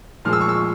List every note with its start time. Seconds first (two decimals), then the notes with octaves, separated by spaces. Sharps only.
0.25 A#2 F3 G#3 F6
0.33 E6
0.41 C#6
0.49 E6